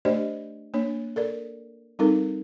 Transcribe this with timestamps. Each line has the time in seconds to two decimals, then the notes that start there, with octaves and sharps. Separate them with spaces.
0.05 A3 D4 G4 C5 D5 D#5
0.74 A#3 D4 C#5
1.16 A4 A#4 D5
1.99 G3 C4 D#4 A4 A#4